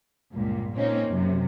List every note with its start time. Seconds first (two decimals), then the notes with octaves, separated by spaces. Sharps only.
0.33 C#2 G2 A#2
0.75 A#2 A#3 C4 C#4 D#4
1.08 F#2 C3